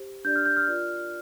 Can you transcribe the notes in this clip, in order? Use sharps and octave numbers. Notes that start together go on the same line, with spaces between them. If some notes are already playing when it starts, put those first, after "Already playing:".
Already playing: G4 C5
D4 G4 D5 G6
F6
G6
F6
F4 A#4 D5